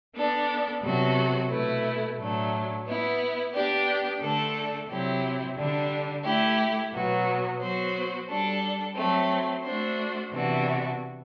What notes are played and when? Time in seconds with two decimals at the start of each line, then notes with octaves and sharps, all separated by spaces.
0.15 B3 D4 A4 D5
0.82 C3 F#3 B3 F#4 A4
1.49 B2 A3 E4 B4
2.18 A2 F#3 A3 D4
2.85 B3 E4 B4
3.53 B3 D4 G4 D5
4.21 D3 A3 D4 A4
4.88 C3 F#3 C4 E4 G4
5.57 D3 G3 D4
6.24 A3 E4 G4
6.92 B2 F#3 B3 F#4
7.60 F#3 B3 F#4 C5
8.28 G3 D4 A4
8.96 F#3 A3 C4
9.63 A3 D4 F#4 C5
10.31 C3 E3 B3 D4 F#4